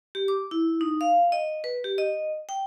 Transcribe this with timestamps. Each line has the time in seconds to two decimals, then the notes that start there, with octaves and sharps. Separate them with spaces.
0.15 G4
0.28 D6
0.51 E4
0.81 D#4
1.01 F5
1.32 D#5
1.64 B4
1.84 G4
1.98 D#5
2.49 G5